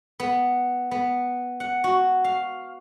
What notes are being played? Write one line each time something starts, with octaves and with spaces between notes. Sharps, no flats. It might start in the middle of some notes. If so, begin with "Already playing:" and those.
B3
B3
F#5
F#4
F5